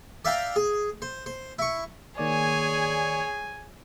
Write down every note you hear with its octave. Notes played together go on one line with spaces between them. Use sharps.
D5 E5 F5 G5 A#5
G#4
C5
C5
E4 C#6
D#3 A#3 G#4 C#5 D5 G#5